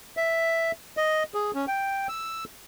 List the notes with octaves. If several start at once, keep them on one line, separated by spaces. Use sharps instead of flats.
E5
D#5
G#4
C#4
G5
E6